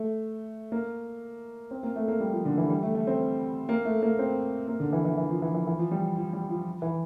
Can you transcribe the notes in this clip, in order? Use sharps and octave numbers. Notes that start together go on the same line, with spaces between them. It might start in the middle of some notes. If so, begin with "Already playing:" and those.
Already playing: A3
A#3
C4
A#3
A3
A#3
G3
F3
D3
E3
G3
A3
A3
C4
A#3
A3
A#3
C4
A#3
D3
E3
E3
E3
F3
E3
E3
E3
F3
G3
F3
G3
F3
E3